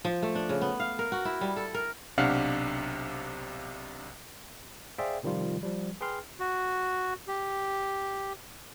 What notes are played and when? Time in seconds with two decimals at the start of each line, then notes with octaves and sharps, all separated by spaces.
0.05 F3
0.22 A3
0.35 D4
0.49 C#3
0.61 B3
0.80 F5
0.99 A#4
1.12 F#4
1.25 E4
1.41 G3
1.57 A4
1.74 A#4
2.18 B1 C3 D4 F5 F#5 F6
4.98 G#4 C5 D5 E5 F5 G5
5.23 C3 D#3 F3 G3 F4
5.63 F3 G3
6.01 G#4 B4 G5 C6 F6
6.40 F#4
7.28 G4